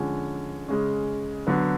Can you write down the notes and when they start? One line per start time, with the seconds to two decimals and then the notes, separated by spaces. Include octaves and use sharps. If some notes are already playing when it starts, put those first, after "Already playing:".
Already playing: D3 F3 G#3 C#4 G#4
0.68 C#3 G#3 C#4
1.47 D3 F#3 B3